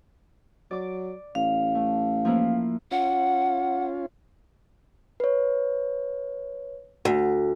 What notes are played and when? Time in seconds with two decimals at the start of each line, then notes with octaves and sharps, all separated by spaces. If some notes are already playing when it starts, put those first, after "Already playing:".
0.71 F#3 D5 D6
1.35 A1 F5
1.75 A3
2.25 F3 A#3 E4
2.91 C#4 F4 F#5
5.20 B4 C#5
7.05 D2